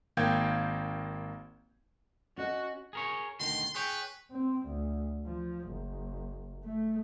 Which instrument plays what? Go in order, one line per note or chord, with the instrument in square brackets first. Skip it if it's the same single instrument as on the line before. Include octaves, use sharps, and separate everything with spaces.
[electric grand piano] G#1 A#3 F5 G5 G6 G#6
[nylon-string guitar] C#4 D#5 [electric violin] F#4
[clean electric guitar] G#4 A#4 C#5
[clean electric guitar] D2 B2 D#3 [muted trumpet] C6
[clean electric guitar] G#4 C#5 G5 [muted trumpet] B4
[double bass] C4
D2
F3
F#1
A3